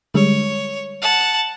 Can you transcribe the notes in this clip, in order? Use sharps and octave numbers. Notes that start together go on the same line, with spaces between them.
D3 G3 G#3 C#5
F#5 A5